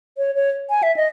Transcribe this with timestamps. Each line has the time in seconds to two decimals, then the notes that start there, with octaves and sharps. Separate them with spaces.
0.18 C#5
0.35 C#5
0.70 G#5
0.83 E5
0.96 D#5